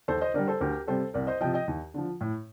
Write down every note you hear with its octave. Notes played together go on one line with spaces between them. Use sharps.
D#2 A4 C5
C5 D#5
D3 G3 A#4 D5
A4 C5
D2 G4 A#4
C3 G3 A4 C5
C2 A#4 D5
C5 D#5
C3 F3 D#5 G5
D#5 G5
D#2
D3 F3
A2